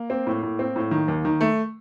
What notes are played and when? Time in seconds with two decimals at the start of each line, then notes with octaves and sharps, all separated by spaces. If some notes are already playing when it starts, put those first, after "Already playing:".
Already playing: A#3
0.10 C4
0.27 A2
0.43 A2
0.59 C4
0.76 A2
0.91 D#3
1.08 D#2
1.25 D#3
1.41 A3